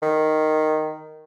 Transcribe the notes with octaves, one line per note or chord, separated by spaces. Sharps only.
D#3